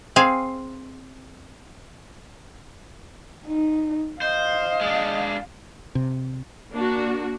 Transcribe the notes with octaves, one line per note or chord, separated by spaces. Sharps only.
C4 G#4 F5
D#4
C5 D#5 F5
G#3 D4
C3
A#3 D4 F#4